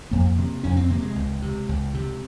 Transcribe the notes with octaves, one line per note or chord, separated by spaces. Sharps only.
F2 A#3
C3
F2 C#4
C4
C3 A#3
G#3
C#2
C3
C#2
C3